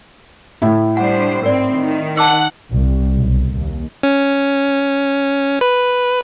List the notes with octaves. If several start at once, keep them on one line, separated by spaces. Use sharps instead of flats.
A2 E4
G3 D4 C5 F#5
G#2 C4 A#4 D5
D#3
F#5 A5 D6 E6
C2
B1
D#2
C#4
B4